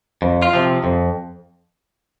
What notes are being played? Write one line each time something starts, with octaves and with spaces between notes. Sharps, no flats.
F2
F4
C3 F3
F2